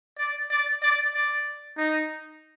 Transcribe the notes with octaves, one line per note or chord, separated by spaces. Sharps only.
D5
D5
D5
D5
D#4